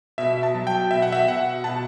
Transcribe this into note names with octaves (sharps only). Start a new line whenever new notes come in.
B2 E5
A5
F#3
G5
B2 E5
F#5
E5
B2 F#5
B2 A5